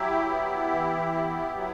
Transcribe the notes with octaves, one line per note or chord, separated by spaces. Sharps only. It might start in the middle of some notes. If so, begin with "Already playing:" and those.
Already playing: F#3 E4 G4
B3
E3
B3
F#3 E4